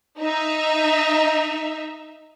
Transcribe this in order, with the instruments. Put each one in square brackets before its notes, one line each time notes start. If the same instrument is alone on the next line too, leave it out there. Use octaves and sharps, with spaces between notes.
[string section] D#4 E5